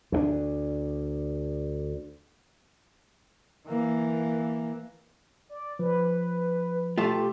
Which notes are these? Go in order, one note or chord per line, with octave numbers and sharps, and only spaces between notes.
D2 G#3 D4
E3 A#3
D5
F3 B4
B1 A3 F4 G4